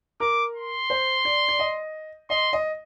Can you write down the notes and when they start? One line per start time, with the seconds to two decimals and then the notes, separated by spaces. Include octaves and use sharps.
0.20 A#4 D6
0.56 C6
0.90 C5
1.25 D5
1.48 D5
1.59 D#5
2.30 D#5 C6
2.53 D#5